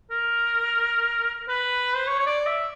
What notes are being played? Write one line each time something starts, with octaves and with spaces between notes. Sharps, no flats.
A#4
B4
C5
C#5
C#5
D5
E5